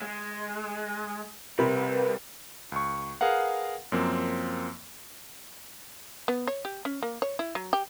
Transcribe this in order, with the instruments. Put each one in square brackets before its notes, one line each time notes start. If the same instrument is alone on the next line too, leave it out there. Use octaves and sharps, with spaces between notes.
[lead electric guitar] G#3
[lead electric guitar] C2 G3 [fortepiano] C3 [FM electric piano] A#4 B4
[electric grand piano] C#2 C#6
G#4 A#4 B4 F5 F#5
F#2 F3 A#3 C4
[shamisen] B3
C#5
G4
C#4
A#3
C#5
E4
F#3
G4